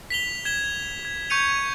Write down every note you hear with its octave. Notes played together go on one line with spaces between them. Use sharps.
B6 F7 G7
G#6 E7 G7
G#6
C#6 G6 G#6 C#7 D#7 F7